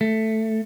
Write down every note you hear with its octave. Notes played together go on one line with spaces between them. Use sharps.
A3